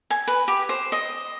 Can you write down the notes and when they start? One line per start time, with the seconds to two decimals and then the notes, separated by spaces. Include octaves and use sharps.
0.10 G#5
0.27 B4
0.48 G4
0.69 C5
0.92 D#5